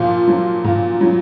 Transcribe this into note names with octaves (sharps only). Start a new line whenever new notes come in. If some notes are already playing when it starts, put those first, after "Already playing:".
Already playing: A#2 F3 F4
F#3
A#2
F#3